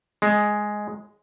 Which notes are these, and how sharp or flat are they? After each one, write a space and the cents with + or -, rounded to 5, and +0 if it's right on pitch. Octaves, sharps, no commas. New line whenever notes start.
G#3 +5